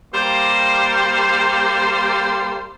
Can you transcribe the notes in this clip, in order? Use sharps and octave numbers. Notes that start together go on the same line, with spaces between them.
G3 A#3 G4 C5 C6